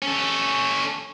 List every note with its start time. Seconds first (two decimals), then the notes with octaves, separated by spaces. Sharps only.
0.02 C#4 A4